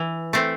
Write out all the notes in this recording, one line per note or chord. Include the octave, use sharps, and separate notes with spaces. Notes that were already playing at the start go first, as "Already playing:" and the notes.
Already playing: E3
A3 C4